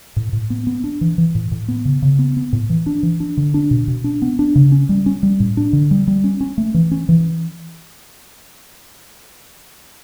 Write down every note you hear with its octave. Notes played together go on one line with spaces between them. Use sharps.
A2
A2
B3
B3
D4
E3
E3
A2
A2
B3
C#3
C#3
B3
B3
A2
E3
D4
E3
D4
D3
D4
B2
B2
D4
B3
D4
C#3
C#4
G3
C#4
G3
A2
D4
D3
G3
G3
C#4
C#4
A3
E3
C#4
E3